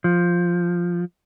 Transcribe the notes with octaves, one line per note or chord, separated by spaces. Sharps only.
F3